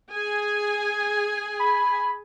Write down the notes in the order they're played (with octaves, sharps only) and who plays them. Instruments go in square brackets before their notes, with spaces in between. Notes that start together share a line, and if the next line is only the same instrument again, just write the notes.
[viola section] G#4 G#5
[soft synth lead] B5